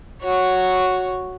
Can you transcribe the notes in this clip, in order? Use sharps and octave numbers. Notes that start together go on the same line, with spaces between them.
F#4 C#5